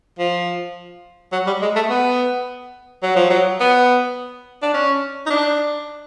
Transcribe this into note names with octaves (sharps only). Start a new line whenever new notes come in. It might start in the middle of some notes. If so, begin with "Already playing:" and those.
F3
F#3
G3
G#3
A3
B3
F#3
F3
F#3
B3
D4
C#4
D#4
D4